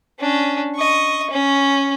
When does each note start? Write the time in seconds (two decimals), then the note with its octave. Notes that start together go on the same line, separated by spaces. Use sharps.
0.20 C#4 D4
0.76 D#5 C#6
1.31 C#4